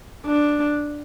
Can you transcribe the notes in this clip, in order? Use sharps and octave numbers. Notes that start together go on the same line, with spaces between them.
D4